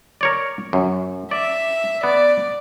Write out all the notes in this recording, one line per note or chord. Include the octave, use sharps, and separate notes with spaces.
A#4 C#5 D5
F#2
D5 E5
B3 D5